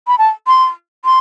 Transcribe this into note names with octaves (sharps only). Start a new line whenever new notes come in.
B5
A5
C6
C6